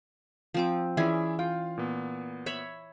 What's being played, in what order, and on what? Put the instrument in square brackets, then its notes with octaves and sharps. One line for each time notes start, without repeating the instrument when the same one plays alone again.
[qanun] F3 C4 D6
[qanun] E3 C#4 G#4 [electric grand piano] E4 D5 E5
[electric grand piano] F4 F5 [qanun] G5
[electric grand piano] A#2 B3
[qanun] C#5 E5 B5